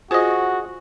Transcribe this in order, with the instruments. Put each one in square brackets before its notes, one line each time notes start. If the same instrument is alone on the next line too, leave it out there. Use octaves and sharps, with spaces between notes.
[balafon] F4 C5 [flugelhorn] F#4 [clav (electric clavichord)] G#4 D#5